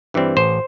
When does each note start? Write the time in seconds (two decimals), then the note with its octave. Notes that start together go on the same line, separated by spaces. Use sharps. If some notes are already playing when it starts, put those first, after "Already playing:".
0.14 G2 E3 G3 C4
0.37 A1 C5